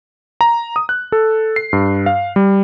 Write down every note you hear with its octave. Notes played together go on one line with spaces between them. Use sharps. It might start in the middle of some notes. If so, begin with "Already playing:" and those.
A#5
D#6
F#6
A4
C7
G2
F5
G3